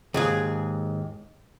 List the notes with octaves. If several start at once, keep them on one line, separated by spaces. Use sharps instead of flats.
D#2 G#2 G#4